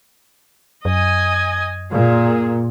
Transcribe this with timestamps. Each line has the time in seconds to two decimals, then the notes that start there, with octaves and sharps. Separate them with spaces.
0.85 F#2 D#5 G#5
1.92 A#2 G#4